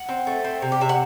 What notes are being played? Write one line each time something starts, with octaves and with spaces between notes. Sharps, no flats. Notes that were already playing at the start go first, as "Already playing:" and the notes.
Already playing: F#5
C4
A3
C4
C3
G4
C3 E5
F#5